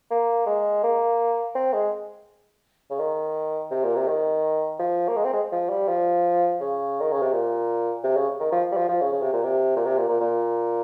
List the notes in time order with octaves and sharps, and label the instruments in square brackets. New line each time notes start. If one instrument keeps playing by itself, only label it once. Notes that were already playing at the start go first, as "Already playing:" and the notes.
[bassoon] A#3
G#3
A#3
C4
G#3
C#3
D#3
C3
A#2
C3
D#3
F3
A#3
G#3
C4
G#3
F3
G3
F3
C#3
D#3
C#3
C3
A#2
C3
C#3
D#3
F3
G3
F3
F3
C#3
C#3
C3
A#2
C3
A#2
C3
A#2
A#2
A#2